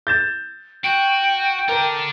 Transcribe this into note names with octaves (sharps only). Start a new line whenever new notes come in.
G6 A6 E7
F#4 G5 D7
A4 A#4 D5